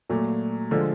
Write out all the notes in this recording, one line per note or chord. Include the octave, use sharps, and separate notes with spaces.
A#2 F#3 A3
D3 F3 G#3